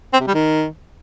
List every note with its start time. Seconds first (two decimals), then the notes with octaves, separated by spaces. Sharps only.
0.13 C4
0.20 C3
0.27 G3
0.34 D#3